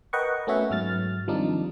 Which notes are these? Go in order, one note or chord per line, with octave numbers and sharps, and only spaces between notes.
A#4 B4 D#5 F#5 G5 C#6
A3 B3 C#4 F#4 C#5 E5
G#2 F#3 F6 A6
D#3 F3 G3 C4 D4 D#4